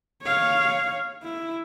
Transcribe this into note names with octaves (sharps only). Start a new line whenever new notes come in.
C#5 F5
E4